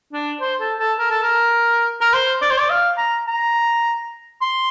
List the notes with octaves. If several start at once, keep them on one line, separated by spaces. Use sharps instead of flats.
D4
C5
A4
A4
A#4
A4
A#4
A#4
C5
D5
C5
D5
F5
A#5
A#5
C6